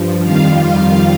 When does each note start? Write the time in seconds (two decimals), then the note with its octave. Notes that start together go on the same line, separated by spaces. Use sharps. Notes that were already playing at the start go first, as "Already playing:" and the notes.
Already playing: G2 F3
0.24 F2 D#3 G3 F4 F5